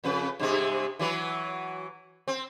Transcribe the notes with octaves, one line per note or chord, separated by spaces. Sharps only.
F2 C#3 B4
G2 C3 G#3
E3 F#3 B4
C4